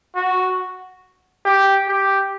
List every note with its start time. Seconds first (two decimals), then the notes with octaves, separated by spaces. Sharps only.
0.15 F#4
1.45 G4
1.88 G4